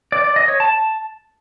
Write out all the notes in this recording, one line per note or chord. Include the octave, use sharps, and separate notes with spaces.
D5
D5
D#5
C#5
A5